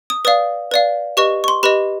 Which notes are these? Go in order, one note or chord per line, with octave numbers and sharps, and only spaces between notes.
D#6
B4 D5 F5 D#6
B4 D5 F5
G4 B4 D#5 C#6
C#6
C6
G4 B4 D#5 B5